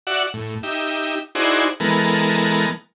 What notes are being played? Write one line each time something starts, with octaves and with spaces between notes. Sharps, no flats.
F#4 D5 E5 F#5
A2
D#4 G4 E5
D#4 E4 F#4 G#4 C5 D5
E3 G#3 B3 A4 A#4